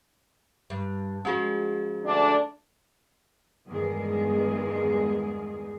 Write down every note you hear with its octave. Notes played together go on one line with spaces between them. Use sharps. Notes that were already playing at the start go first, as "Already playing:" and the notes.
G2
F3 G#3 C#4 F#4 G#4
D2 D4
E2 G2 D#3 G#3 G#4